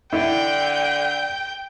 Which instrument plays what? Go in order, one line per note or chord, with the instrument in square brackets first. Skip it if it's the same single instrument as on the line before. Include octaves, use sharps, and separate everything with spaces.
[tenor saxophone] D3 [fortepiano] E4 [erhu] G5